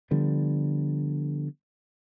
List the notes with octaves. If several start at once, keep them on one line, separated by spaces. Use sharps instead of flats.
D3 F3 G3 B3